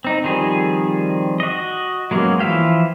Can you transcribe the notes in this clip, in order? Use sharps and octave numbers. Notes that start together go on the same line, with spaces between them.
C4 D#4
D#3 F3 G3 C4 G#4
F#4 D#5
F#3 G#3 A#3 B3 C#4
E3 F3 E5 F5 G5